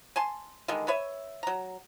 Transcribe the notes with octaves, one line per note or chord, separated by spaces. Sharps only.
G#5 A5 C6
D3 D#3 G3 G#3
B4 C#5 E5
F#3 A#5